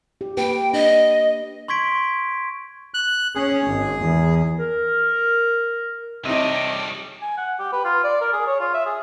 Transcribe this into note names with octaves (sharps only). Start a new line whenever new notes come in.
G4
A#3 G4 B4 G5
D4 D#5
C6 C#6 G#6 B6 D7
F#6
C#4 G#4
G#1
E2
A#4
C3 G3 D#4 C#5 D#5 A5 D6
G#5
F#5
G4
B4
F4
D5
A#4
G#4
C#5
F4
E5
G#4